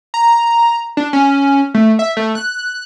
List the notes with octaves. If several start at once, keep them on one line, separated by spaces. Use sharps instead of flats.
A#5
D4
C#4
A3
E5
A3
F#6